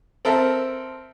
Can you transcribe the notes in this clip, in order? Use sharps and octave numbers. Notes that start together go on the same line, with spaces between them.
C4 A4 A#4 E5